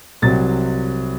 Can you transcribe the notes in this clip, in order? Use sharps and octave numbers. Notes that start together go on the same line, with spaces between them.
C2 C3 F#3 C4 A6